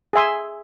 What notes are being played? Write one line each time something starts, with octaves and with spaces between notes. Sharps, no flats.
G#4 E5 G#5 C6